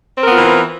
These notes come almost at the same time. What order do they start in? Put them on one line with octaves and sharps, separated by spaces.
C4 A#4 B3 F4 E3